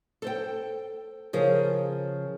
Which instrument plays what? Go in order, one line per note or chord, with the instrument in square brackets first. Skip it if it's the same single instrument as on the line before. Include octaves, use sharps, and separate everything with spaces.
[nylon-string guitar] A4 C5 G5
C#3 F3 G#4 A#4